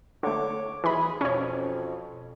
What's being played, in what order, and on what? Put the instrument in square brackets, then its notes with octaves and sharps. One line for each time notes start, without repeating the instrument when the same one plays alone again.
[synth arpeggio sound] D3 A3 [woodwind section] C#5 D6
[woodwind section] D#2 B2 G#4 [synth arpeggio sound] E3 B5
[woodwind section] F2 B2 [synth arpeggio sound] C#4 C#5